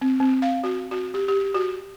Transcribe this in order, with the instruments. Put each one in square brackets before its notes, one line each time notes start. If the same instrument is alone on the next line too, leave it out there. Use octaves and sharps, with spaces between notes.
[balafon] C4
C4
F5
F#4
F#4
G4
G4
F#4